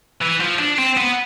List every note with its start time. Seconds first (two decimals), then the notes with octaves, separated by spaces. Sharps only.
0.22 E3
0.41 F3
0.59 D4
0.79 C4
0.97 B3